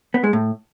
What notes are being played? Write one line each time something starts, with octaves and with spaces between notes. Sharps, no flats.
B3
G#3
A2